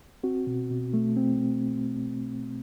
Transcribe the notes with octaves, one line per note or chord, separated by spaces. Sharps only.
C4 F#4
B2
B2
A3
C4